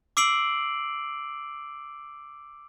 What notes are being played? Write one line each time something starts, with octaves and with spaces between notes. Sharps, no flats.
D6 E6 C7 D7 F#7